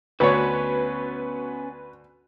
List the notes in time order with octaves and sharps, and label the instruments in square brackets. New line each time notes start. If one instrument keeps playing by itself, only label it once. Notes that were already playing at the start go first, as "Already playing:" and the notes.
[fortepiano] D2 C#5 [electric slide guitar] B3 C#4 F#4 [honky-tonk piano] B4